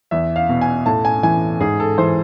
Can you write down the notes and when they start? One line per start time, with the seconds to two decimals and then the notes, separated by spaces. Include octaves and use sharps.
0.11 E2 E5
0.36 F5
0.49 B2
0.61 G#5
0.86 A2 A5
1.05 G#5
1.23 E3 G#5
1.60 G#2 G#4
1.80 A4
1.98 E3 C5